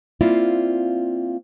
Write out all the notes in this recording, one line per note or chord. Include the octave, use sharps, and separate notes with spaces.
A#3 C4 E4 F4 D5 F5